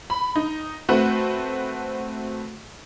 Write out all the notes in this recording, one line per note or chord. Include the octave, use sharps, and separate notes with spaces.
B5
D#4
A3 C4 F#4 B4